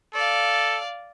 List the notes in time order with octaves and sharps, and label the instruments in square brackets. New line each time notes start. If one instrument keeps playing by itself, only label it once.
[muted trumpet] A4 [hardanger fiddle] D5 F5